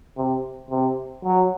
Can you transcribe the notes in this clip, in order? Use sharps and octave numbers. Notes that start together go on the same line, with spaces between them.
C3
C3
F#3